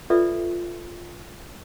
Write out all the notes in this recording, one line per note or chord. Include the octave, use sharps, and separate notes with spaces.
F4 A4 B4 D5 E5